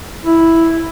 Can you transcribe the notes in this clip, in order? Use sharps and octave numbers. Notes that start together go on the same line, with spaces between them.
E4